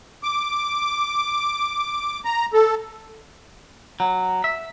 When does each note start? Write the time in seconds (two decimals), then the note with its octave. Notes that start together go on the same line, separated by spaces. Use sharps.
0.23 D6
2.25 A#5
2.54 A4
4.00 F#3
4.44 E5